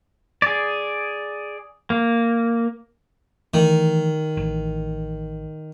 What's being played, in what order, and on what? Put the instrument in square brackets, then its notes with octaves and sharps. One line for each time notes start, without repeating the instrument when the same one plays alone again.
[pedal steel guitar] G#4 D5
A#3
[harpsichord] D#3 [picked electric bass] E3 A3
[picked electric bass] A1